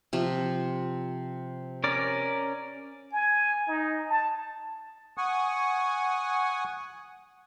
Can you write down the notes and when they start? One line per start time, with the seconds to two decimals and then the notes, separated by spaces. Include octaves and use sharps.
0.13 C3 F3
1.84 C#4 A#4 D5
3.13 G#5
3.68 D#4
4.09 A5
5.18 F#5 G#5 C#6 D#6